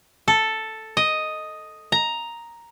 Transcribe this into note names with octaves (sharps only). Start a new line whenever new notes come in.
A4
D#5
A#5